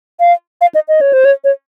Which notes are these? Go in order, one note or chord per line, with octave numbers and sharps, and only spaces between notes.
F5
F5
D#5
D#5
C#5
C5
C#5
C#5